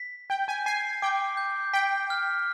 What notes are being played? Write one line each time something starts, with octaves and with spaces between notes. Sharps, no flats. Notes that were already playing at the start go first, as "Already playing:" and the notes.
Already playing: B6
G5 G6
G#5
G#5 C7
G5 D6
G6
G5 B6
F6